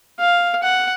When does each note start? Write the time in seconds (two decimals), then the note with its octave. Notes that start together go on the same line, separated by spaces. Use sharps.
0.19 F5
0.63 F#5